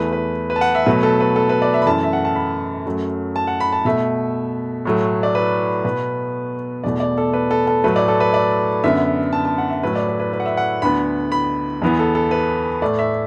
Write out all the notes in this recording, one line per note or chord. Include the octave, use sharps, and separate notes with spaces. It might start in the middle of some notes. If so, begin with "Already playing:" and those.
Already playing: E2 E3 A3 B4
B4
B4
A5
F#5
E5
B2 F#3 A3 B4
A4
B4
A4
B4
D5
E5
B5
F#2 E3 A3 A5
E5
F#5
A5
B5
F#2 F#3 A3
A5
F#5
B5
A5
B2 A3 E5
A2 F#3 A3
D5
B4
B2 B3 B4
E2 B2 A3 D5
D5
A4
B4
A4
A4
A2 F#3 A3 B4
D5
A4
B4
D5
F#2 D3 B3 E5
A5
A5
F#5
E5
A2 F#3 A3 B4
D5
B4
B4
B4
F#5
E5
F#5
D2 D3 B3 B5
B5
E2 E3 B3
A4
A4
B4
A2 A3 D5
E5